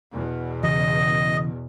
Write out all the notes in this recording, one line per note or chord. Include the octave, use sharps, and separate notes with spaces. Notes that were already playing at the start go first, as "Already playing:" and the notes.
E2 B2
C#3 E3 D#5